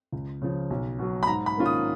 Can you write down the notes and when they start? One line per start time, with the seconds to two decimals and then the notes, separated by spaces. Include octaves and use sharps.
0.12 C#2
0.42 C#3 F3
0.70 B1
0.99 B2 F#3
1.23 B5
1.27 G#2 A#5
1.46 B5
1.56 D#3 A#3 C#4 F4
1.66 D#6